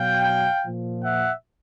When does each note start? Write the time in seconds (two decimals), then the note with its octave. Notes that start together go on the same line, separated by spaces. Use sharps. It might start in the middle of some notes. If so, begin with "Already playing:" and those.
Already playing: B2 F#3 F5 G5
0.64 A#2 F3
1.04 E5 F#5